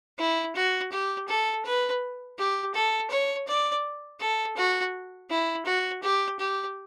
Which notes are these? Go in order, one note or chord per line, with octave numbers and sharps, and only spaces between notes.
E4
F#4
G4
A4
B4
G4
A4
C#5
D5
A4
F#4
E4
F#4
G4
G4